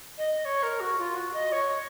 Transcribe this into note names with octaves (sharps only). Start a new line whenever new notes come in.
D#5
C#5
A#4
F#4
F4
F#4
D#5
C#5